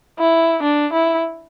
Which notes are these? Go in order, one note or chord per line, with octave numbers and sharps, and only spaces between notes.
E4
D4
E4